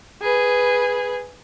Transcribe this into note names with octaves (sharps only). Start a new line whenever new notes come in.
G#4 B4